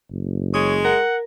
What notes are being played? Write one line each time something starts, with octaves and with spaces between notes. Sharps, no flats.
F#1
G#3 C#5 D#6
A#4 F#5